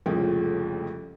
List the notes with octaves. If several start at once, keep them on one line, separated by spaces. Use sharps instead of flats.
C2 F2 A2 C#3 F3 G#3